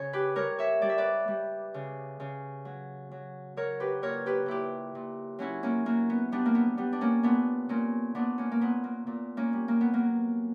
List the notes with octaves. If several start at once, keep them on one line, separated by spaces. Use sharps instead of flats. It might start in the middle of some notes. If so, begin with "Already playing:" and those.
Already playing: C#3 C#5
G4 B4
G3 A#4 C#5
C#5 E5
G3 D5
E5
B4 D5
G3
C#3
C#3
F#3
F#3
F#3 A#4 C#5
G4 B4
A#2 A#4 C#5
G4 B4
A#2 E4 G4
A#2
F#3 C#4 E4
A#3 C#4
F#3 A#3
B3
G3 B3 D4
A#3
B3
G3 B3
D4
A#3 C#4
A#2 B3 D4
A#2 A#3 C#4
A#2 B3 D4
A#3 C#4
A#3
A#2 B3
A#3
A#2
A#3 C#4
G3
A#3
B3
F#3 A#3